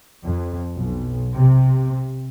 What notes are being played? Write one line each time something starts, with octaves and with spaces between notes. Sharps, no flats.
F2
B1
C3